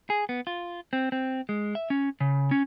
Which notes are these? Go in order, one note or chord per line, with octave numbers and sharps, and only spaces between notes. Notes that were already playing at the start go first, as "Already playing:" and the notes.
G#4
B3
F4
C4
C4
G#3
E5
C#4
C#3
C#4